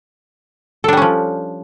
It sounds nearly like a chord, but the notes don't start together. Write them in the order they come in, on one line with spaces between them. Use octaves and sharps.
A4 D4 G3 C#4 F3